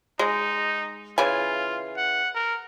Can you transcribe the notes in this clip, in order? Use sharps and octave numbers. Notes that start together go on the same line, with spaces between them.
G#3 D#4
C#3 E3 F4 G#5
F#5
A#4